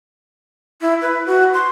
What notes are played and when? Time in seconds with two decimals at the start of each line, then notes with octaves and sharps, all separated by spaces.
0.81 E4
1.02 B4
1.26 F#4
1.54 C6